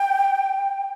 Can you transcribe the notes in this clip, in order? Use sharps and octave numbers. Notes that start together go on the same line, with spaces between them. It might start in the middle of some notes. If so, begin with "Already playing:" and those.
Already playing: G5